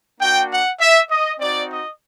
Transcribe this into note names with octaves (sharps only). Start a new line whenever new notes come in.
A#3 D4 F#4 G5
F#5
E5
D#5
C4 D#4 F#4 D5
D#5